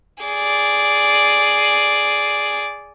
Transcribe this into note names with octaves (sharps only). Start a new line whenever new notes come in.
G#4 D5